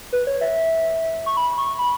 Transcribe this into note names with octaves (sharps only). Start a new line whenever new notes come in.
B4
C#5
E5
C#6
B5
C#6
B5